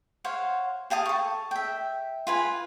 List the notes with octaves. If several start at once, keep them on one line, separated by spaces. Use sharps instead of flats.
C5 C#5 F5 F#5
G4 F5 A5 D#6
A4 C#6
E5 G5
F4 B4 G#5